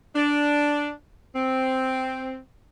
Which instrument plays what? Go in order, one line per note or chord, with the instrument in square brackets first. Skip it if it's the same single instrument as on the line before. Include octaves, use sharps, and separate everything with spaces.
[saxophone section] D4
C4